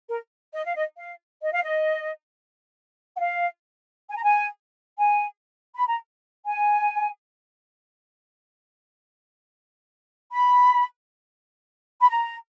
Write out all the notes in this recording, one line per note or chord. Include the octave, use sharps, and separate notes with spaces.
A#4
D#5
F5
D#5
F5
D#5
F5
D#5
F#5
F5
G#5
A#5
G#5
G#5
B5
A#5
G#5
B5
B5
A#5